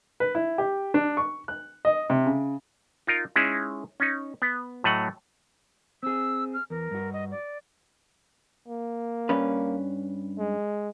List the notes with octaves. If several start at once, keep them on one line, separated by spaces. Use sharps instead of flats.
B4
E4
G4
D4
C#6
F#6
D#5
C3
C#3
D#4 F4 A#4
G#3 C#4 D#4 E4 G#4
C#4 D#4
B3
A2 F#3 A3 D#5 F#5
C4 G#4 E6
F6
E2 A#4
G2 F#4
D#5
D5
A#3
G2 C#4 B4
G#3